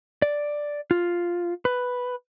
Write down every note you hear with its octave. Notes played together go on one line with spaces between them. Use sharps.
D5
F4
B4